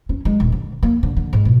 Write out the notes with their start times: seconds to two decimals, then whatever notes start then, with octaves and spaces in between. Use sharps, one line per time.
0.09 C#4
0.25 G#3
0.40 D#1
0.52 D3
0.83 A#3
1.03 D3
1.17 D3
1.33 G#2
1.45 B2